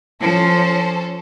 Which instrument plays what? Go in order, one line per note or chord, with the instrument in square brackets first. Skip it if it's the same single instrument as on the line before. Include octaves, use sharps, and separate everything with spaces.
[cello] F3 [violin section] C#4 A4 C5